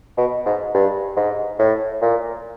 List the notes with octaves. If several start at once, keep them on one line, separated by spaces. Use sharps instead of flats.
B2
G#2
G2
G#2
A2
A#2